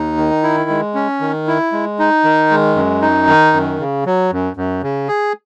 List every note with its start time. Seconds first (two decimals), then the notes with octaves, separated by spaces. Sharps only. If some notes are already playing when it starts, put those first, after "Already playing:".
Already playing: D#2 D#4
0.17 D#3
0.43 E4
0.70 G#3
0.95 C#4
1.21 D#3
1.47 E4
1.72 G#3
1.99 D#4
2.24 D#3
2.51 G#3
2.76 F#2
3.02 D#4
3.27 D#3
3.53 F#2
3.79 C#3
4.06 F#3
4.32 F#2
4.57 F#2
4.83 C#3
5.08 G#4